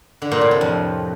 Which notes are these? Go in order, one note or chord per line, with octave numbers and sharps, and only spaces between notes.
D3
A#2
A2
C3
F2